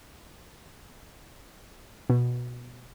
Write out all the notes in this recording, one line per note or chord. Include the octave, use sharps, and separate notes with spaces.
B2